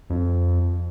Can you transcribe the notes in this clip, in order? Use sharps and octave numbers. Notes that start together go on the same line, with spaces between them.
F2